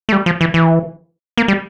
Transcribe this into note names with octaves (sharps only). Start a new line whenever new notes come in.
A3
G3
F3
E3
E3
A#3
G3